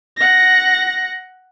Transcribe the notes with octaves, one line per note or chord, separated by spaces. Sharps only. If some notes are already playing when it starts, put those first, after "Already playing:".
F#5 A#6